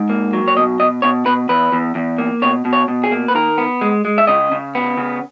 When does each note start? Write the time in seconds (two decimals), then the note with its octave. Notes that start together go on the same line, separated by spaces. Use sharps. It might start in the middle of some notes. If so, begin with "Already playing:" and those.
Already playing: G#2
0.10 A#3
0.33 F#3
0.48 C#5
0.56 B2 D#5
0.80 B2 D#5
1.02 B2 C#5
1.26 B2 B4
1.49 E2 B4
1.72 E2
1.95 E2
2.18 A#3
2.42 B2 C#5
2.65 B2
2.73 C#5
2.88 B2
3.04 G#4
3.11 A#3
3.28 B4
3.35 D#3 A#4
3.58 B3
3.81 G#3
4.05 G#3
4.18 E5
4.27 C#3 D#5
4.52 C#3
4.75 B3
4.97 C#3